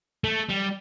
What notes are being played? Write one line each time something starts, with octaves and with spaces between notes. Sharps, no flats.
A3
G3